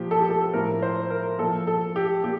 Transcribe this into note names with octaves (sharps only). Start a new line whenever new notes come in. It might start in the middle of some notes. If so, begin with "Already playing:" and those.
Already playing: A#2 F3 G4
A4
G4
A4
A2 F3 A#4
C5
A#4
A#2 F3 A4
A4
G4
A#2 G4